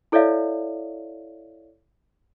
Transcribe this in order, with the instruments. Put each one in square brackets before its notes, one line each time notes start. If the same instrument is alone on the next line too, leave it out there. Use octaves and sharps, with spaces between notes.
[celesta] E4 A4 C#5 D5 E5 F5